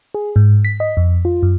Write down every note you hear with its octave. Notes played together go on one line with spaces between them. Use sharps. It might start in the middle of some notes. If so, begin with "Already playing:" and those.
G#4
G#2
B6
D#5
F2
F4
F#2